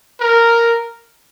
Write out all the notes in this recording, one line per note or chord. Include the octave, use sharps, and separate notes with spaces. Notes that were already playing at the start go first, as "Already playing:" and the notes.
A#4